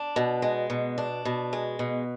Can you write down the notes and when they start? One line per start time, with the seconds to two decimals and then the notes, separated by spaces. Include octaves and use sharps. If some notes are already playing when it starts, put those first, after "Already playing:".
Already playing: D4
0.16 B2
0.42 G#3
0.70 B2
0.98 D4
1.25 B2
1.53 G#3
1.79 B2